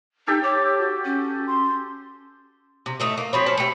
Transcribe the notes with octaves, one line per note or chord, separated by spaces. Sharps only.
D#4 G4 A4 G5
C#5 D6
F#4
C#4
C6
C3
A2 A3 D#4
A#3
F3 C4 C#5 B5
C#4 C5 A5
A3 G4 C#7